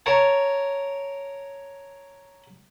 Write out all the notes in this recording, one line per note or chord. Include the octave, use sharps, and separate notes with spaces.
A#4 C#5 A5